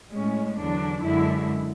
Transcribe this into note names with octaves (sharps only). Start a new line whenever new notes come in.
A2 G#3 C#4
E2 D3 F#3 D4
F#2 D3 G#3 E4